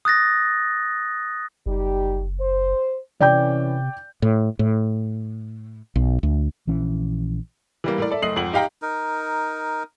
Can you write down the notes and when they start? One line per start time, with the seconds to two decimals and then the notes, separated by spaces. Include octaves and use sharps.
0.05 D#6 F#6 A6 A#6
1.66 F#1 G3 D#4 G4
2.39 C5
3.20 C3 E3 C#4 D5 G5 G6
4.22 A2
4.59 A2
5.96 B1
6.23 D2
6.67 A#1 E3 C#4
7.84 E3 G3 A#3
7.98 A2 A#4 D5
8.11 A4 D5 E5
8.22 F#1 A3 D#5 D#6 C7 F#7
8.36 G#1 F2 F#5 F#7
8.53 D#4 G4 F5 G5 A#5
8.82 D#4 A#4